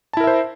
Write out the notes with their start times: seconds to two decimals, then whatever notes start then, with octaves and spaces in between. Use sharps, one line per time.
0.13 A5
0.17 E4
0.20 A#4
0.24 E5
0.27 C5